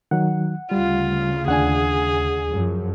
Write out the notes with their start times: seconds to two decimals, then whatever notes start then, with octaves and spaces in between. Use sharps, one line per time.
0.11 D#3 F#3 F#5
0.71 D2 C#3 G3 F4
1.48 D#2 D4 G#4 F#5 G#5
2.49 F#2 F3 F#3